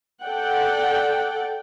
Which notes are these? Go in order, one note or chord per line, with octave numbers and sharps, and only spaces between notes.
A4 D5 F#5 G5